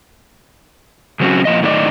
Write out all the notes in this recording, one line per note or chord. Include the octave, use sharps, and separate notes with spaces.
C#3 F#3 C4 C#4 F#4
A#2 F3 D#5
A2 D#3 G3 A#3 D5 D#5